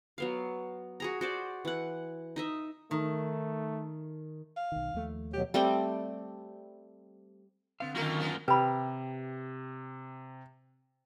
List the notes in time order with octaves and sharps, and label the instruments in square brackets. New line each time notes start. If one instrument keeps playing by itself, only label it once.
[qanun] F#3 B3 F5
F#4 G#4 A#5
F#4 C5 D5
E3 F#5
D#4 D#5 E5
[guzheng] D#3 [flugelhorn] A3
[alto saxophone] F5
[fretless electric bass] B1 D#3
D#2 F3 A3
[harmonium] B2 F#3 [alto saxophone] G4
[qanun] G3 A3 C4 G5
[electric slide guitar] D3 C4 F5 [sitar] B3
[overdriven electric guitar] F#2 A#3 [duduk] D#3 [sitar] A3 F4 A#4
[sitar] B3 F4
[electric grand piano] C3 [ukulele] G4 [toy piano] B4 B5